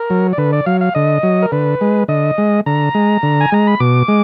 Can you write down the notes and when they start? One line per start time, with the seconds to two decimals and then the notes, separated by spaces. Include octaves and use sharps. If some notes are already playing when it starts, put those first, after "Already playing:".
Already playing: A#4
0.10 F#3
0.33 D5
0.38 D3 B4
0.53 D5
0.66 F#3 F5
0.81 F5
0.95 D3 D#5
1.23 F#3
1.42 A#4
1.52 D3 B4
1.81 G#3
2.08 D3 D#5
2.38 G#3
2.66 D3 A#5
2.95 G#3
3.23 D3
3.41 G#5
3.52 G#3 A#5
3.67 B5
3.80 B2 D6
4.08 G#3